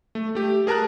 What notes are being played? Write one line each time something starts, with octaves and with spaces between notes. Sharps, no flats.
A3
A3 G4
G#4 A#4 A5 A#5 F#6